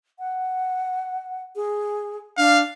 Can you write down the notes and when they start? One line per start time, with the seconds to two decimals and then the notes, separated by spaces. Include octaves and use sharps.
0.19 F#5
1.55 G#4
2.37 D4 F5